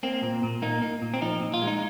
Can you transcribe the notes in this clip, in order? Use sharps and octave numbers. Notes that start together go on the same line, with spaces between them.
A#3 C4
A#2
A#2
A#3 D#4
A#3
A#2
C4
F3 D#4
A#2
F4
G#3
D#4